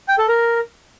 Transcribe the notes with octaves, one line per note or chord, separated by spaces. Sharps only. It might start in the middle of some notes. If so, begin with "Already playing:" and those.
G5
A4
A#4